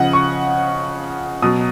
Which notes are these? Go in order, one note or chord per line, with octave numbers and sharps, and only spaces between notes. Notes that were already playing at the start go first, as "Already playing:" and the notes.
Already playing: C#3 F3 D#5 F#5
C#6
B2 F#3 D#6